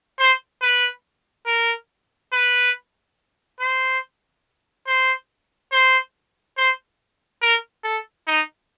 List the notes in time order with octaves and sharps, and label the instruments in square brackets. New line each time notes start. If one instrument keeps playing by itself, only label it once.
[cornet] C5
B4
A#4
B4
C5
C5
C5
C5
A#4
A4
D#4